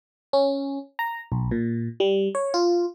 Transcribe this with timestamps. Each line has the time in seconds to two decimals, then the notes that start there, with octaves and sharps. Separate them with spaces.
0.33 C#4
0.99 A#5
1.32 B1
1.51 A#2
2.00 G3
2.35 C#5
2.54 F4